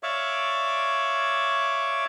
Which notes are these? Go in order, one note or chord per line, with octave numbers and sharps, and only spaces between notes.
C#5 D5 E5 F5 C#6 D6